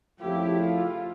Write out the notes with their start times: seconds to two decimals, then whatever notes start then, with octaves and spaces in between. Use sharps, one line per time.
0.20 F2 C#3 F3 A3 E4 G4
0.62 F4